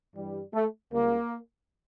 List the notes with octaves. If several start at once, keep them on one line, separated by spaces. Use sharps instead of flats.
G2 E3 G3
A3
C#2 C#3 G3 A#3